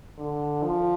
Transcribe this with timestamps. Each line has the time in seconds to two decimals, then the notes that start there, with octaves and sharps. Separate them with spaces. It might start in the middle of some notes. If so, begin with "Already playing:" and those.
0.18 D3
0.64 F3